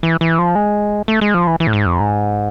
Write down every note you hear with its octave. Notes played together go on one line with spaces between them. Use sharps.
E3
E3
F3
G#3
A3
G#3
F3
E3
E3
A2
G#2
F2
G#2